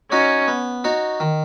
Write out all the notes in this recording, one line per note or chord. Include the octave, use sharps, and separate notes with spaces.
C#4 D#4 F#4 C#5
B3
D#4 F#4 C#5
D#3